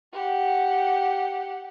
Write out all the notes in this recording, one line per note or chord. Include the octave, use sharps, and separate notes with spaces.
G4 F#5